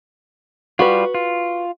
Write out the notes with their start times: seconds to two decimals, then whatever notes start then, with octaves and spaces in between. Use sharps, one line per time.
0.79 G3 F4 F#4 B4
1.14 F4